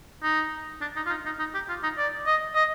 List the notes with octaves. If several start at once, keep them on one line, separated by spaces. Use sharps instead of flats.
D#4
D4
D#4
F4
D#4
D#4
D#4
G4
F4
D#4
D5
D#5
D#5